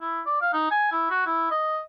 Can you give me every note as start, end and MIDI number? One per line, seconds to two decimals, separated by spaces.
0.01 0.20 64
0.26 0.40 74
0.41 0.51 77
0.53 0.70 63
0.71 0.88 80
0.92 1.05 64
1.10 1.22 66
1.26 1.50 64
1.51 1.80 75